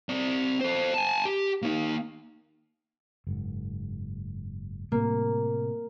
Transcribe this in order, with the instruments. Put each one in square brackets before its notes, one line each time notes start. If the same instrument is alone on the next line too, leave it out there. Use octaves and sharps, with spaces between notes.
[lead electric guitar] C4 D5
A4 C5
G#5 A5
G4
A#3 D#4
[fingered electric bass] F#1 G#2
[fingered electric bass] A2 C3 [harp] A#3